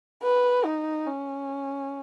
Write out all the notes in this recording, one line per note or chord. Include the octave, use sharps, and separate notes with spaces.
B4
D#4
C#4